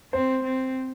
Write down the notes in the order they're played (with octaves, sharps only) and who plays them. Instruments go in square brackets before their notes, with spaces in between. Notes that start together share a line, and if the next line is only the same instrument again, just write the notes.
[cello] C4 [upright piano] C5
[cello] C4